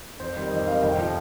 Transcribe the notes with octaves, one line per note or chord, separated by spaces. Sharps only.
F2 C5
D#3 G3
F2 D#5
D#3 G3 F5
F1 G5
F3